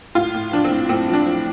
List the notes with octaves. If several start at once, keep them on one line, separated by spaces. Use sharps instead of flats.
A2 F4
A2
F3 D4
C4
A2
A2 C4
F3
D4
F3